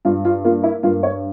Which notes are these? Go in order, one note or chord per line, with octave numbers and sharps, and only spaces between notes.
G2 F4
F4
A#3 F4
E4
G2 F4
C#5